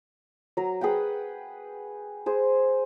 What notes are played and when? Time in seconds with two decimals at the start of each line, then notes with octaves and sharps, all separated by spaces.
0.57 F#3 A#4
0.81 G#4 B4 F#5 G5
2.26 G#4 C5